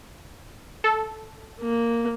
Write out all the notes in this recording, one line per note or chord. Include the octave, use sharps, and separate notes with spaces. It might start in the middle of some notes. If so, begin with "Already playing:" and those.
A4
A#3